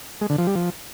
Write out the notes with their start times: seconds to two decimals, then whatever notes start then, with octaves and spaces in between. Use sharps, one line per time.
0.21 G#3
0.30 D3
0.38 F3
0.47 G3
0.55 F3